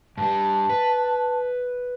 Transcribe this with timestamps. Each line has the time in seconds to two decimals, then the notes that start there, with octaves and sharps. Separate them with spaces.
0.17 G2 G3 A5
0.69 B4